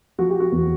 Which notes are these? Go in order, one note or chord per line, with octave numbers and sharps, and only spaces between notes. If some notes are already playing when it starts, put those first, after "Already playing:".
F3 F#4
G4
F#4
E2